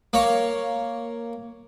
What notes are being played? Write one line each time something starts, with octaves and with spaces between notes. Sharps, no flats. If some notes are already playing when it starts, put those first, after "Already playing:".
A#3 C#5